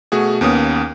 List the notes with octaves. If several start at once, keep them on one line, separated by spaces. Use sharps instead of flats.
B2 A3 F#4 G#4
D#2 A#3 B3 C#4 D#6